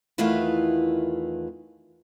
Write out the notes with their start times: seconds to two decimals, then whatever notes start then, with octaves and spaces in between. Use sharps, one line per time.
0.18 E2 D#3 A3 E4 F4 B4